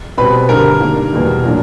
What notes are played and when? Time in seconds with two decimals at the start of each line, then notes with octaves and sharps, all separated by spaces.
0.17 B2 G3 C4 B4 B5
0.49 G2 D3 G3 A#4 A#5
0.81 G2 D#3 G3 A#3
1.13 E2 B2 G3 A#3
1.44 A#2 F#3 A#3 D4